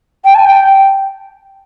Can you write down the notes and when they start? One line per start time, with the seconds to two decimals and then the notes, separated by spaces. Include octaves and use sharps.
0.25 G5
0.35 A5
0.45 G5